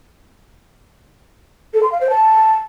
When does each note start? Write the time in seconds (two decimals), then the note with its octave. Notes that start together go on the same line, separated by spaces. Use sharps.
1.74 A4
1.83 C6
1.92 F5
2.01 C5
2.10 A5